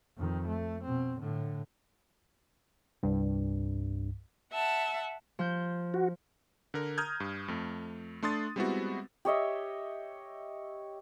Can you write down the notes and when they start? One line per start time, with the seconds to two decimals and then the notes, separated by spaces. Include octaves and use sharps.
0.18 F2 D#3
0.48 A3
0.84 B2 C4
1.18 A2 D3
3.03 C2 G2
4.52 E5 F#5 A5
5.39 F3 G6
5.94 F#4
6.74 D3 A#4
6.98 A#5 D#6 F6 G6 G#6
7.20 G2
7.48 F2 A3
8.23 A3 D4 C6 D#6 A6
8.56 G3 G#3 B3 C4 E4 F#4
9.25 G4 C#5 D#5 E5